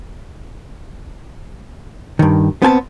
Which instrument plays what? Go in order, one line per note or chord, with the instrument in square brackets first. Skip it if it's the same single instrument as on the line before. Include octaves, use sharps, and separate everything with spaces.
[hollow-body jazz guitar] G2 D#3
B3 C4 G#5 A5